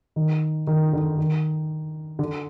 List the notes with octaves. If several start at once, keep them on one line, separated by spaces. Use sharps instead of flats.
D#3
D#3
D3
D#3
D3